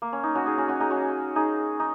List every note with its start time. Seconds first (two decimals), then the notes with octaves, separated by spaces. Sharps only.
0.02 A#3
0.13 C#4
0.24 D#4
0.35 C#4 F#4
0.46 D#4 G#4
0.58 C#4 F#4
0.68 C#4 F#4
0.80 D#4 G#4
0.90 C#4 F#4
1.36 D#4 G#4
1.80 D#4